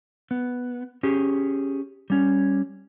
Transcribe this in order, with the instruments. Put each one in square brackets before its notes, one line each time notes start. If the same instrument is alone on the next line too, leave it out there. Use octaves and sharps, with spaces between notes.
[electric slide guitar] B3
C#4 G4 G#4
G3 C#4